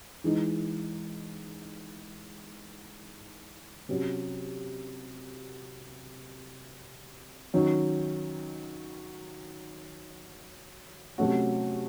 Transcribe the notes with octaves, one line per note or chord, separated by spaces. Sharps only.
E3 G#3 D#4
C3 F#3 C#4
D#3 F#3 C#4
C3 F#3 A3 C#4 F#4